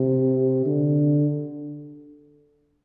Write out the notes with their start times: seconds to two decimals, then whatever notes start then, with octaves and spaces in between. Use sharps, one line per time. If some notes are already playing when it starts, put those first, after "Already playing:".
Already playing: C3
0.66 D3